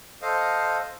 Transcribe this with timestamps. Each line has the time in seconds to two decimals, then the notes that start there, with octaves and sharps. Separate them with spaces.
0.22 A4 C5 D#5 F5